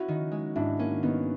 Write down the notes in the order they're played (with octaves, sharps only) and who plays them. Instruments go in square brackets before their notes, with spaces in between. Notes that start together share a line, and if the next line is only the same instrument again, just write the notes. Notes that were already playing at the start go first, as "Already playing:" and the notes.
Already playing: [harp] C#4 [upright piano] E4 F#4
[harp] D#3
G#3
[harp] G#2 [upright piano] D4 E4
[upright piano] A#3 [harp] C#4
[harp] D#3 [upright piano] B3